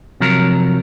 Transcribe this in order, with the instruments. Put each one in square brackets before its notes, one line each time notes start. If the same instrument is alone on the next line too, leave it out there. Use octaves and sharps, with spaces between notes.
[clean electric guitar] C3 F3 F#3 A#4